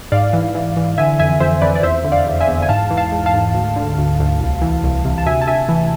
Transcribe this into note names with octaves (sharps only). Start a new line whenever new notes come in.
G#2 D5 F5
E3
E3
E3
D3 E5 G#5
F2 E5 G#5
F2 C5 E5
F2 B4 D5
D5
E2 C5 E5
D3
D5 F5
E2
E5 G#5
E2
G#5
G#2 F5 A5
E3
F5 A5
G#2
F5 A5
G#2
D2
D3
D2
D2
C2
E3
C2
C3
A5
D2 E5 G#5
A5
D2 E5 G#5
E3